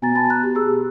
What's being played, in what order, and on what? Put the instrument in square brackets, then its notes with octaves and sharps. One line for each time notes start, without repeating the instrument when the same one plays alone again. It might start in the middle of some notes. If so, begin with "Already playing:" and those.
[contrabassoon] B2 [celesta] G#5 A#5 A6
[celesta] A5 B5 A6
A#5 F#6
G4
G4 G#4 E6